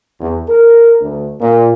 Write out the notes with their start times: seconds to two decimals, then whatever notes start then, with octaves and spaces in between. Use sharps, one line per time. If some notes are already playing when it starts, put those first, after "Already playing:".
0.19 E2
0.48 A#4
1.01 D2
1.40 A#2